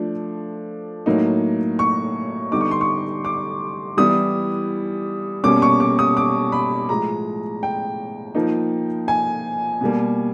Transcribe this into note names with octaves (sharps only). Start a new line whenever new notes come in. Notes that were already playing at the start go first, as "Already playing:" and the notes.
Already playing: F3 A3 D4
A2 F#3 A#3 D#4
C#6
D3 G3 B3 D#4 D6
C#6
C6
C#6
D6
E3 G3 B3 E4 D#6
B2 G3 A#3 C#4 D6
C#6
D6
D#6
D6
B5
A2 F3 G#3 A#5
G5
F3 A#3 D#4
G#5
B2 G3 A#3